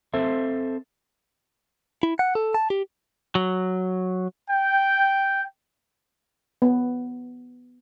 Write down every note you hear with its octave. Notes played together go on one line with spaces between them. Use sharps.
C4 A4 C5 E5
E4
F#5
A4
A5
G4
F#3
G5
B3